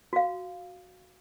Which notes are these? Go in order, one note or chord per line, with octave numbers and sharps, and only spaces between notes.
F#4 F5